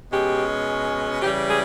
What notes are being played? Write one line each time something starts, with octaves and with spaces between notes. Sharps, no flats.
B2 G#3 C#4 G4
C#3 E3 G3 G4
G#4